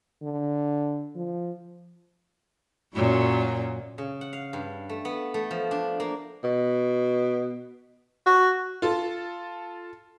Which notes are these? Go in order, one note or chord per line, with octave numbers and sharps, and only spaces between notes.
D3
F3
F#2 A#2 F#3
C#3
F#5
F5
G2
A3
B3
A3
F3
D4
A#3
B2
F#4
F4 A4